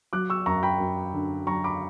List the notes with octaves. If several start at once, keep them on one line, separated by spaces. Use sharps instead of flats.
F#3 D6 F#6
C#6 E6
F#2 A#5 C#6
G5 B5
F#2
D3
F#3 A#5 C#6
B5 D6